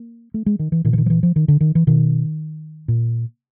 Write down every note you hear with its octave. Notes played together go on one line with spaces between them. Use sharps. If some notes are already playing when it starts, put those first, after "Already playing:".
Already playing: A#3
A3
G#3
D#3
E3
A#2 D#3
E3
D#3
F3
E3
F3
D#3
D3
D#3
E3
B2 D#3
A#2